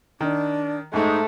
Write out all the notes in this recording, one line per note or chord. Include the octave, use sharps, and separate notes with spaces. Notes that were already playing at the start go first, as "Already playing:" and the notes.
D#3 D4
G#2 G#3 A3 D#4